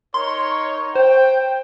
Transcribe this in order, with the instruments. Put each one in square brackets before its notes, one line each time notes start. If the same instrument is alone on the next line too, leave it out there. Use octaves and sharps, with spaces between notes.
[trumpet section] D#4 A#4 C#5 [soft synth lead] C6
[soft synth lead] C5 [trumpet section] G5